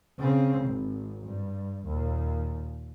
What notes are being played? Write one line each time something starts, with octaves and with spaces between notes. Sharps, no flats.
C#3 C4
G#1
G2
D#2 A#2